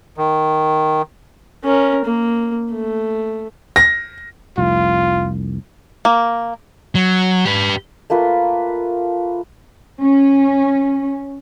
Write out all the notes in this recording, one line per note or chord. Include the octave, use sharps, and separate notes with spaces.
D#3
C#4 A#4
A#3
A3
A#6
F1 C2 F4
A#3
F#3
G4 B4
A3 A#3 F4 B4
C#4